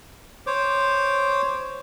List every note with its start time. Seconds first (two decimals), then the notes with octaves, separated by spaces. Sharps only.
0.47 C5 C#5 D6